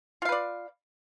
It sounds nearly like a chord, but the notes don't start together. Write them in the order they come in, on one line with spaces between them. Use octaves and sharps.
F4 F5 B4 D5